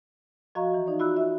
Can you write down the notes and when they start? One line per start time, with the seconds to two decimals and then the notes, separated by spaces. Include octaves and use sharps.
0.55 F3 F#4 D#5 F5 A#5 C#6
0.74 E3
0.87 D#4 D5
0.99 F4 F#4 B5 E6 F#6
1.17 E5